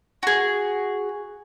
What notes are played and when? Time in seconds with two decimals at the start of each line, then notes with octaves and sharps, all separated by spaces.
0.23 F#4 G#4